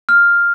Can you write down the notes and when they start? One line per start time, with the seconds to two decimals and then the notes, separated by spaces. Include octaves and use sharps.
0.09 F6